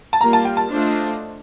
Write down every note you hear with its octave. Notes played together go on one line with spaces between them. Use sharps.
A5
G3 A#3 F4 A#5
A5
G5
A5
A3 D4 F4 C5 D#5